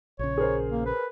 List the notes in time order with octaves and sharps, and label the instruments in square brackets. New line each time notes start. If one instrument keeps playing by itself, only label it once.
[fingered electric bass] A#1 C#3 [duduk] C#5
[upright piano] G#4 A#4 C5
[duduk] A#3
B4